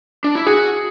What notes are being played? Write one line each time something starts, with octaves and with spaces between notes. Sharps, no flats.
D4
E4
F#4 G#4